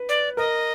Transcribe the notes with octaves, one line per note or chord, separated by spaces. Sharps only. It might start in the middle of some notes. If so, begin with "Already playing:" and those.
Already playing: B4
D5
A#4 D#5